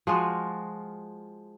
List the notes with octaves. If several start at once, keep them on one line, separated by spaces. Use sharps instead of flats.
F3 G#3 F4 F#4